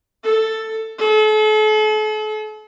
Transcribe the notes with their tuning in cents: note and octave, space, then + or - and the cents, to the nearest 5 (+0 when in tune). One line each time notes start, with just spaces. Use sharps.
A4 +10
A4 -40